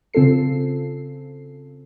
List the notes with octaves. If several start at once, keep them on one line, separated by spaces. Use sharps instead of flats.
C#3 C4 F4 A4 C7